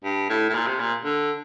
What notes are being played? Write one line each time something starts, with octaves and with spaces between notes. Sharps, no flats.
G2
A2
A2
A#2
C3
A#2
D3